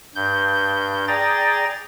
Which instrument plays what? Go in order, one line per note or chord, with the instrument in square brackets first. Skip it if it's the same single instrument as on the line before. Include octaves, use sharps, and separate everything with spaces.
[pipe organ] G2 G6
G#4 D5 G5 A#5 A6